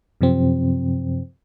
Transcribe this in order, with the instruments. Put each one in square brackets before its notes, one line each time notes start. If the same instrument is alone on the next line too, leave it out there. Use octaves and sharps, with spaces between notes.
[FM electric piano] F#2 C3 F3 C4